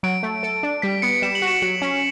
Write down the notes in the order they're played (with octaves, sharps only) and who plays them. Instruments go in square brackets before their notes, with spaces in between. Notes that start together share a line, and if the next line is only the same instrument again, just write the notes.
[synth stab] F#3 [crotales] D7
[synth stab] A3
A4
D4
[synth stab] G3 [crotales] B6
[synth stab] B3 [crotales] C#7
[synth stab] G3 [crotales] E7
[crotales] F#7
[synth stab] F#4
[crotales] E7
[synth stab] F#3 [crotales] F#7
[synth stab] C#4